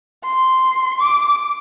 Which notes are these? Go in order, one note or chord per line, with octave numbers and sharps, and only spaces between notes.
C6
D6